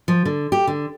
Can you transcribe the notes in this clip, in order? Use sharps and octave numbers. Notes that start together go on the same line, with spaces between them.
F3
D3
G4
D3